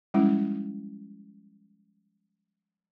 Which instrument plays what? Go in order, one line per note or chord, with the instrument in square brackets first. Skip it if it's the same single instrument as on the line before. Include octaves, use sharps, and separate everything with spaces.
[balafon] F3 G3 G#3 C#4 E4